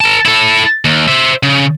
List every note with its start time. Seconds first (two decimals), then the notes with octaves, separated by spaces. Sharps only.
0.01 A#4 A5
0.26 E4 A4
0.85 D#2
1.08 C5 E5
1.43 C#3